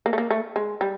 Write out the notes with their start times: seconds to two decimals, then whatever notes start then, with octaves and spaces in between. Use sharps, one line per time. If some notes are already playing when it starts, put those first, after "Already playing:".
0.06 A#3
0.13 A3
0.18 A#3
0.31 A3
0.56 G#3
0.81 G3